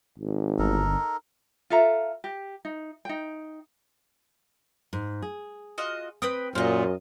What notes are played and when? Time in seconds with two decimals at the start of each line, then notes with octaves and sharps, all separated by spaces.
0.19 G#1
0.59 G1 D#4 A4 A#4
1.70 F4 A4 E5 A#5
2.24 G4
2.65 D#4
3.05 D#4 G5
4.93 G#2
5.22 G#4
5.78 F4 F#4 D#5
6.22 C4 B4 G5 D#6
6.55 F#2 A#2 F4 C5 D#5